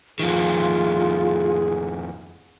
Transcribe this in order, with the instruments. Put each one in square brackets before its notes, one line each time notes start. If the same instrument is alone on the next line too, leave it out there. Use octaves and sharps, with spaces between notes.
[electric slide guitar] F2 D#3 [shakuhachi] F4 [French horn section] G#4